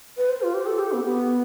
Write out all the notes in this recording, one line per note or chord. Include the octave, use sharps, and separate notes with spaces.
B4
C5
F4
G4
A4
G4
B3
B3